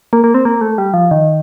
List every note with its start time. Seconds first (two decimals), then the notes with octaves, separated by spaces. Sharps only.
0.13 A#3
0.24 A#3
0.34 C4
0.45 A#3
0.61 A3
0.78 G3
0.94 F3
1.11 D#3